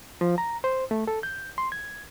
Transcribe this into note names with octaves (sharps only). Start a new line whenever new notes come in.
F3
A#5
C5
A3
A4
G6
C6
G#6